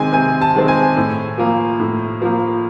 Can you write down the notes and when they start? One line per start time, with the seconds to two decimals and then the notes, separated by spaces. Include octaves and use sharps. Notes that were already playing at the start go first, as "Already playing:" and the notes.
Already playing: C3 D#3 G#3 C4 G#5
0.13 C3 G#5
0.41 A5
0.55 D#3 G#3 C4
0.68 G#5
0.97 A2
1.38 F3 A#3
1.80 A2
2.22 F3 A#3